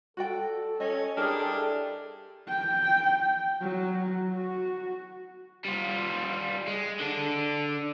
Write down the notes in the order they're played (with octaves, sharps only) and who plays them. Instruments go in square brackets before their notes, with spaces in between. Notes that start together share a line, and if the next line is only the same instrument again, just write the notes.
[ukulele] F#4 D5 G5 [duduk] A4
[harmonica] C#4 [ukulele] D#5 G#5
[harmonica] D4 G4 [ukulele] E4 A#4 [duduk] G#4
[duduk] A4
[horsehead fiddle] G5
F#3
F#4
[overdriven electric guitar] G3 F4
G#3
D3 D4